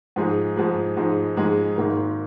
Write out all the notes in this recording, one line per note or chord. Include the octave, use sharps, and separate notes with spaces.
G#2 F3 G#3 D#4 G#4
G#2 F3 G#3 D#4 G#4
G#2 F3 G#3 D#4 G#4
G#2 F3 G#3 D#4 G#4
G#1 G#2 D#3 A#3